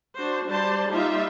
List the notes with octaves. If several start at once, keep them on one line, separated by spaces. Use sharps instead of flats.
D4 F#4 C5
G3 C5 D5 A5 C6
G3 A#3 D#4 F4 G4 E5